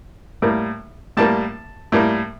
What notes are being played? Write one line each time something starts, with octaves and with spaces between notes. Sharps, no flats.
A2 G3 A#3
A2 G3 A#3 A5
A2 G3 A#3